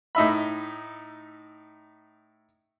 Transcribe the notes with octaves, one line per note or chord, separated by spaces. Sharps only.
A2 D#4 E5 B5